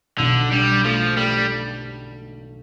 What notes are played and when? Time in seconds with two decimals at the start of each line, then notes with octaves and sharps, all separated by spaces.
0.19 B1 D3
0.51 G3 D4
0.84 F3 A3
1.16 G3 A3